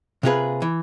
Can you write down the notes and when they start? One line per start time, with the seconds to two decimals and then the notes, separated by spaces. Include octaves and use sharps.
0.23 C3 A#3 F4 F#4 G#4 B4
0.62 E3